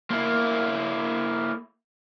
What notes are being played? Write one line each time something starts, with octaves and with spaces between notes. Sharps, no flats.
A#3 E4